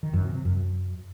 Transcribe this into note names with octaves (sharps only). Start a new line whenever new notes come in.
D#3
F#2
C3
C3
F#2